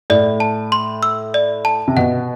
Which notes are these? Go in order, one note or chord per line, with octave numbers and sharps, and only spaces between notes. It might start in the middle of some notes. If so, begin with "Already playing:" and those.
A2 D5
A5
C6
E6
D5
A5
C3
B2 F#5